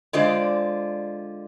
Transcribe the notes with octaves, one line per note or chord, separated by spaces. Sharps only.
D3 G#3 F4 C5 D5